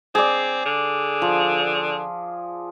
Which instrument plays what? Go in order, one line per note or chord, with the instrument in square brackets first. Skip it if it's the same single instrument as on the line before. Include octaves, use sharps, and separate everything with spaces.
[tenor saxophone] C4 [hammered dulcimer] G#4 D5
[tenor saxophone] D3
[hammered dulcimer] F3